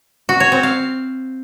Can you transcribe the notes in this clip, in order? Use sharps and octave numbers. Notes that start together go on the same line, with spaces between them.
F#4
C#5
C4
F5